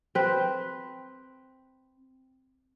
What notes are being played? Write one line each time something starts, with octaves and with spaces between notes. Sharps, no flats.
C4 B4